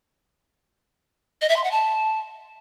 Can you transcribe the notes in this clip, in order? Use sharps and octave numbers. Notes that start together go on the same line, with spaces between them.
D#5
E5
C6
F#5
A5